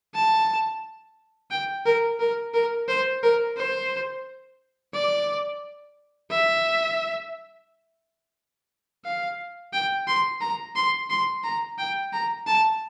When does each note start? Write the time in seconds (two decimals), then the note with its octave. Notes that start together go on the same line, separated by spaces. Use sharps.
0.14 A5
1.51 G5
1.86 A#4
2.20 A#4
2.54 A#4
2.88 C5
3.23 A#4
3.57 C5
4.93 D5
6.31 E5
9.05 F5
9.73 G5
10.07 C6
10.41 A#5
10.76 C6
11.10 C6
11.44 A#5
11.78 G5
12.13 A#5
12.47 A5